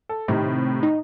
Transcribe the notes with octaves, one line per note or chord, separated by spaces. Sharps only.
A4
A2 C3 D#3
D#4